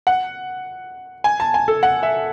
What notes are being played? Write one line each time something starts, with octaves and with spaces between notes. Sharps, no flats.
F#5
G#5
A5
G#5
A4
F#5
E5